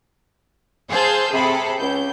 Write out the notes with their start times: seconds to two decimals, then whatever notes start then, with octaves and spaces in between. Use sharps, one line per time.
0.90 G#4 C5 F5 A5 E6 G6
1.33 C3 G#4 A4 B5
1.79 C#2 G6